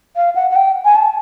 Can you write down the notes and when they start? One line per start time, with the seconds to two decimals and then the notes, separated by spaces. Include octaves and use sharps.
0.16 F5
0.36 F#5
0.51 F#5
0.56 G5
0.85 G#5
0.95 A5